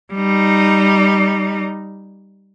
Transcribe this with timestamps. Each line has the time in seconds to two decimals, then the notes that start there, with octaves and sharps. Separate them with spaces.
0.13 G3 D#4